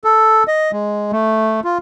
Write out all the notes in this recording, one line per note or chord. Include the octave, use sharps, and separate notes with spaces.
A4
D#5
G#3
A3
F4